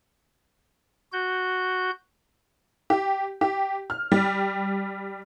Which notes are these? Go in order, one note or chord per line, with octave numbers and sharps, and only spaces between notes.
F#4 G6
G4
G4
F6
G3